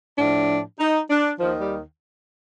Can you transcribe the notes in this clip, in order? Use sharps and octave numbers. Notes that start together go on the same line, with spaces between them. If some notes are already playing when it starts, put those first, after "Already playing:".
A2 F3 D4
D#4
D4
D#2 D#3 F3
G3